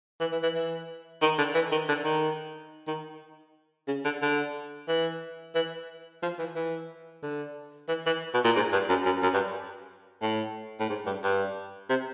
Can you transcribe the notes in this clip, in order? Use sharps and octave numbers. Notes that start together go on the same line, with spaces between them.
E3
E3
E3
E3
D#3
D3
E3
D#3
D3
D#3
D#3
C#3
D3
D3
E3
E3
F3
E3
E3
D3
E3
E3
B2
A#2
G#2
G2
F#2
F#2
F#2
G2
A2
A2
G#2
G2
G2
C3